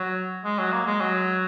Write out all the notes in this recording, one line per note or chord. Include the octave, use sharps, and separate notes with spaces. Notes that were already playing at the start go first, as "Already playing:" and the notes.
Already playing: F#3
G#3
F#3
A#3
G#3
F#3